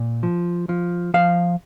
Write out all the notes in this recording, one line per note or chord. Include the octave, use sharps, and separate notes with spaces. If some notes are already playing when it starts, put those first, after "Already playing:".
Already playing: A#2
F3
F3
F3 F5